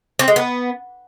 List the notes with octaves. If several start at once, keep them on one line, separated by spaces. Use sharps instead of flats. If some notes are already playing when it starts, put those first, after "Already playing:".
C4
G#3
B3